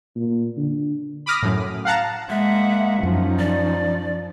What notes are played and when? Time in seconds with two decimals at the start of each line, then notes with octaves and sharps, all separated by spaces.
0.15 A#2
0.57 D3
1.26 B5 D6 D#6 F6 A#6
1.42 F#2 A2
1.85 F5 F#5 A5 A#5
2.30 G#3 A#3 E5 F#5
3.03 F#2 F3 C#4 D#4
3.39 D5